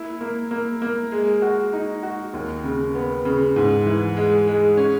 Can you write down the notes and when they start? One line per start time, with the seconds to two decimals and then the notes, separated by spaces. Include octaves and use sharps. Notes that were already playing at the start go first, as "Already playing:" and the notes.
Already playing: A#3 E4
0.21 A#3
0.51 A#3
0.82 A#3
1.12 G#3
1.42 F#4
1.73 D#4
2.03 F#4
2.34 D#2
2.64 C#3
2.95 B3
3.25 C#3
3.56 G#2
3.86 E3
4.17 G#3
4.47 G#3
4.77 C#4